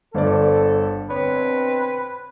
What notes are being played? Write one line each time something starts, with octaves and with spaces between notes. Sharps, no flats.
G1 A4 C5 D5
B2 D3 C4 B4 C#5